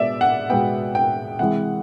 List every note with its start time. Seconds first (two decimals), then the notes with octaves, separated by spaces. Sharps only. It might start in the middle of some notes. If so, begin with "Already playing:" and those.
Already playing: B2 G#3 B3 D5 E5
0.21 F#5
0.49 B2 G#3 B3 G5
0.95 G5
1.39 C3 E3 G#3 F#5